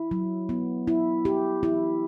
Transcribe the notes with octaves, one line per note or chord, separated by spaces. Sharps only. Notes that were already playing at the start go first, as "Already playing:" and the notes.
Already playing: E4
F#3
B3
E4
G4
E4